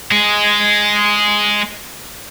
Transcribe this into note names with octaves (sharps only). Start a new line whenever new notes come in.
G#3 G#4